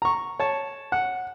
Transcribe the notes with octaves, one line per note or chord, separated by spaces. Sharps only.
A#5 C#6
C#5 A5
F#5